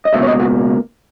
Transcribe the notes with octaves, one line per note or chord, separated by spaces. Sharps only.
D#5
C#2 B2 A#3 E5
C#5
D#5
F#4